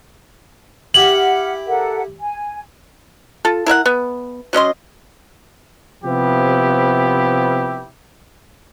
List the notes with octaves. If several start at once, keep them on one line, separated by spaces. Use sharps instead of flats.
E4 G4 F#5 F6 F#7
A4 A#4 F#5
G#5
F4 A4
E4 A#4 E5 F#5
B3
F#3 C#4 D#5 C6
C3 F3 B3 E4 G4